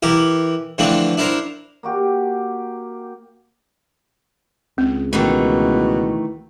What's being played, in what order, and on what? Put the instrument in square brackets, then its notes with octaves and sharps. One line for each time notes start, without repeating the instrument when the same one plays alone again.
[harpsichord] E3 E4 G4 A#4
D3 E3 F3 A3 C4 D4
D4 E4 A#4 C5 A#5
[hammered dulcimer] A#3 F#4 G4
[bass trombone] C#2 [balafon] C4
[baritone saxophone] B2 [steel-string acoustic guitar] D#3 E3 A3